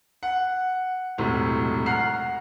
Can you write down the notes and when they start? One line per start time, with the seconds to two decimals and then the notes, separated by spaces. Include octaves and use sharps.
0.23 F#5
1.18 E1 B1 A2 C3
1.86 F#5 A#5 F6 F#6 C7